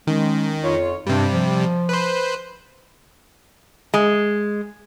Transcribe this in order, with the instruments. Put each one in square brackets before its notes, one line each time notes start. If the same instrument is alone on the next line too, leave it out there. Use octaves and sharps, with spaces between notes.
[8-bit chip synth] D#3 [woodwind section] G#3 C#4
[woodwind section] F2 F4 C#5
[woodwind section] G2 [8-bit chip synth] C3 G3
[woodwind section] F3
[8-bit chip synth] B4 C5
[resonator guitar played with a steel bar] G#3